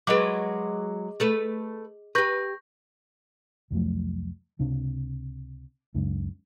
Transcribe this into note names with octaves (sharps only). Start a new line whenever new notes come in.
F#3 G#3 G#4 B4 D#5 D6
A3 A4 B4
G4 B4 C#6 G6 A#6
C2 F2 F#3 A3
C#2 C3 D4
C#2 F#2 C#3 G#3